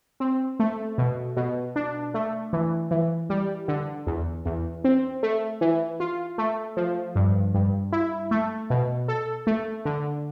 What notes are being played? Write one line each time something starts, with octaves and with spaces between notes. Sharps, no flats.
C4
A3
B2
B2
D4
A3
E3
E3
G3
D3
E2
E2
C4
A3
E3
F4
A3
F3
G2
G2
E4
A3
B2
A4
A3
D3